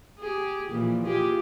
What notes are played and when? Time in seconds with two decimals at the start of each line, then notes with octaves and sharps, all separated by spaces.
0.19 G4 G#4
0.69 A#2 E3 F3
1.05 F4 G4 G#4